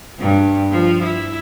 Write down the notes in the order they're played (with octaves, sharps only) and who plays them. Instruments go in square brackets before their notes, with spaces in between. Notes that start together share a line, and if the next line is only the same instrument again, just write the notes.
[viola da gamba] G2
F3
E4